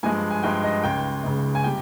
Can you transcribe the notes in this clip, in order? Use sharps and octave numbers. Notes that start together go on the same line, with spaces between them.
G2 F3 G#3 G#5
G#5
G2 F3 G#3 G5
D#5
C#2 C#3 G#3 G5
C#2 C#3 G#3
G#5
C3 G3 G5